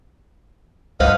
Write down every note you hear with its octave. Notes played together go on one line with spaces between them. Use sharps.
C#2 G2 B4 C5 D#5 F5 F#5